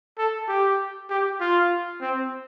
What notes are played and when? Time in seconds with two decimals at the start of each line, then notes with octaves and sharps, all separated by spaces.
0.18 A4
0.48 G4
1.09 G4
1.40 F4
2.01 C4